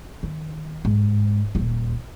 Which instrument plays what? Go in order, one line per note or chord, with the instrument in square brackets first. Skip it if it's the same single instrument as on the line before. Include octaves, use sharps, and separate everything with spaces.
[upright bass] D#3
G#2
D#1 G#1